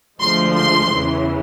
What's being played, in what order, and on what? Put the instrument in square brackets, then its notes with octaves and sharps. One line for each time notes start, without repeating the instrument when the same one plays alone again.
[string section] D2 D3 F3 G#3 C6
C6
E2 C#3 E3